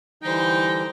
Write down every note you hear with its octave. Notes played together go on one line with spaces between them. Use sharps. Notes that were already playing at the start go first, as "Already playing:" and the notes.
D3 E3 G3 D#4 C5 G5